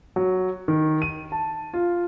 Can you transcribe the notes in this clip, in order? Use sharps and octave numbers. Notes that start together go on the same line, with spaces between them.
F#3
D#3
D#7
A5
F4